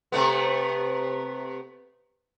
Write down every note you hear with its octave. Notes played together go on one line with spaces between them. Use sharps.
C3 A3 B3